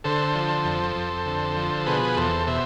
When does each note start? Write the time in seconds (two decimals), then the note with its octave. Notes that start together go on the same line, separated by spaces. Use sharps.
0.04 D3 A4 C5
0.35 F3
0.65 F2
0.96 F2
1.26 D3
1.57 F3
1.86 B2 G#4 B4
2.17 E2 A4 C5
2.47 B2 C5 E5